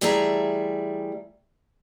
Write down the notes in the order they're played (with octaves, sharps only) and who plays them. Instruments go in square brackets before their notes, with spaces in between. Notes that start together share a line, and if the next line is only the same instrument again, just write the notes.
[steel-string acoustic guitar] E3 G3 A3 G#4 E5 A#5